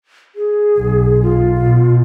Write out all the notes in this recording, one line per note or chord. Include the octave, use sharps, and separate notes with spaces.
G#4
B1
F4
B2